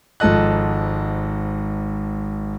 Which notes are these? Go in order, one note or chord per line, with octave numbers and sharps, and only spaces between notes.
G#1 G#2 F3 A4 D#5 F#6